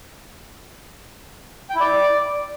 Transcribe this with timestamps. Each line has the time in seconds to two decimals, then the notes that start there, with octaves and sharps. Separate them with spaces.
1.70 G5
1.75 E4
1.80 D5